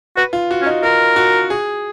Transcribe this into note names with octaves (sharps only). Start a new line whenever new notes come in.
F#4 B4
F4
F#4
C#4
D#4
F4 A#4
F#4
G#4